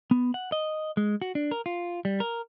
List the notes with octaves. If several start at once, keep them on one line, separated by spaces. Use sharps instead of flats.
B3
F#5
D#5
G#3
F#4
D4
A#4
F4
G3
A#4